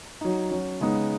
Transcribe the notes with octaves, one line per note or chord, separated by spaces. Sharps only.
F#3 D#4
F#3 C#4
C#3 G#3 B3 D#4